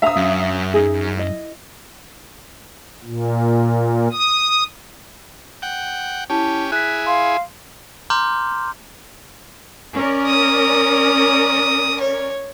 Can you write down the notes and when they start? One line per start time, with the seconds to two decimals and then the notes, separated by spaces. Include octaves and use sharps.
0.02 D4 E5 F5 A#5 D#6
0.16 F#2
0.74 D#4 G#4
1.17 E4 D#5
3.04 A#2
4.12 D#6
5.62 F#5 G5
6.30 C#4 E4 G4 A5
6.72 E4 G#4 F#6 B6
7.06 F5 C6
8.10 A#5 C6 D6 F6 G6
9.94 C#4 A#4 D5
10.28 D#6
12.01 C#5